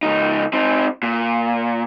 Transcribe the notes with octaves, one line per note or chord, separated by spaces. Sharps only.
C#2 D#4
C4 D#4
A#2